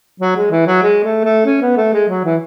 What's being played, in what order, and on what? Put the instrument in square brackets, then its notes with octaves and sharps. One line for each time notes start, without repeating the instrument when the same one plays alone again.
[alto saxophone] F#3
G#3
E3
F#3
G#3
A3
A3
C#4
B3
A3
G#3
F#3
E3